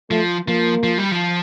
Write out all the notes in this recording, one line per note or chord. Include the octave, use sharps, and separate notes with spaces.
F3 A3
F3 A#3
F3
G3
F3